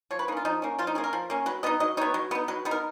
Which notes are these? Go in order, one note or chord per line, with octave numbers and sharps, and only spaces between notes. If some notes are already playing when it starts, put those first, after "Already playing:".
F3 C#5
B4
A#3 C#4 D#4 F4
F3 D#4
A#3 C#4
F3 F4
D#4
A#3 C#4 G#4
A#4
F3
A#3 C#4
F#3 B4
B3 D#4 D#5
F#3 D#5
B3 D#4 C#5
F#3
B3 D#4
F#3 B4
B3 D#4
A#4